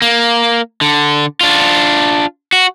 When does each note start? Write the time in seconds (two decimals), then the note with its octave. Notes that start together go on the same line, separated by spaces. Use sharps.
0.02 A#3
0.81 D3
1.41 D4 F4
2.53 F#4